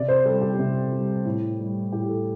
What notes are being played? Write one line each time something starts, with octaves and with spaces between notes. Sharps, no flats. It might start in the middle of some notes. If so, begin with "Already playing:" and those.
Already playing: C3 D5
C5
G3 A4
G4
C3
G3
A2
G3
A2 G4
A4